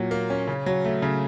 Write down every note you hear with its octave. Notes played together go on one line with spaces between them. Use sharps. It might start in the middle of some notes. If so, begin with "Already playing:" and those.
Already playing: A#2 F#3
A#3
C#4
C#3
F#3
A3
C#3